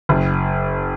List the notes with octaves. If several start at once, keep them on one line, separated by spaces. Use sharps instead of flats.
F#1